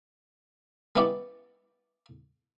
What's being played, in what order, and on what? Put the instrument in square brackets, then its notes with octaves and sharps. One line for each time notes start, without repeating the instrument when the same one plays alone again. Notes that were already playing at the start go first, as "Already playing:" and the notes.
[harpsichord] G#3 B3 C#4 E4 G4 D5